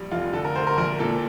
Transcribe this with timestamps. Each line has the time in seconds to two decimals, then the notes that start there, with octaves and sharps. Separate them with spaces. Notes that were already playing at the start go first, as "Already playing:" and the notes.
Already playing: A#1 G3
0.11 F1 F4
0.33 D3 A4
0.45 A#4
0.55 D2 C5
0.67 A#4
0.77 A#1 A#4
0.99 A#2 A4